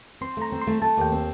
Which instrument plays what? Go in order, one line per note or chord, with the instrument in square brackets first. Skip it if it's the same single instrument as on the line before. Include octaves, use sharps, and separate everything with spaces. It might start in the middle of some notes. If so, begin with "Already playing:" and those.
[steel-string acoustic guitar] C4 [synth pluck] C6
[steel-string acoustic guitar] A3 [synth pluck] A#5
[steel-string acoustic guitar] C4
[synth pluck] C6
[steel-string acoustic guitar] A3
[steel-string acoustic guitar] A3 [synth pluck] A5
[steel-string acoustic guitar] D#2 [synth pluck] G5
[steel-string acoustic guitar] C4